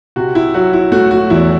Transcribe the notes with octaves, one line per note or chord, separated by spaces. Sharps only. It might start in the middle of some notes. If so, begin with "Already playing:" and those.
C3 F#4
E4
F#3 F#4
E4
A3 F#4
F#4
E2 E4